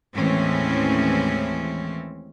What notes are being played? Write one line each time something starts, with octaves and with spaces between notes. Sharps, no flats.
D#2 A2 E3 G#3 C4 C#4